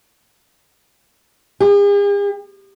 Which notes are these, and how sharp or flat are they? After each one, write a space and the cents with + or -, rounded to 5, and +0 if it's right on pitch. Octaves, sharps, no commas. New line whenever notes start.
G#4 -45